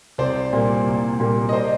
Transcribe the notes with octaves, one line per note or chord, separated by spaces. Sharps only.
C2 C5 D5
A#2 G3 A#3
C2
A#2 G3 A#3
D#5
C5 D5